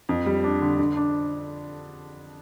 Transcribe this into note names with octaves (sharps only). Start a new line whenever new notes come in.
F2
G3
D4
D3
D3
D4